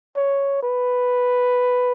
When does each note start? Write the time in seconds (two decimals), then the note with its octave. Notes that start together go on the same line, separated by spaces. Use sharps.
0.16 C#5
0.63 B4